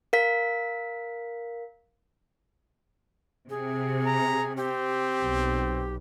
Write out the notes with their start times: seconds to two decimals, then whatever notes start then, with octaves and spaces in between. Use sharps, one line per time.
0.13 A#4 F5 B6
3.50 C3 G#4
4.06 A#5
4.57 C4 G4
5.22 B1